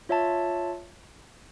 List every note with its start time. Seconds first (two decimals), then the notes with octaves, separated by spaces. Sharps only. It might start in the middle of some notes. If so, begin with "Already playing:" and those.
0.09 F4 C#5 E5 A5